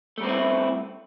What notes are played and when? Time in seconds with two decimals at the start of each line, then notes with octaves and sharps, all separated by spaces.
0.18 A3
0.20 G3
0.23 C4
0.26 B3
0.29 E4